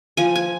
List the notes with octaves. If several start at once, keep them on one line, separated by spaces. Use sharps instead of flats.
F3 G#5
G#5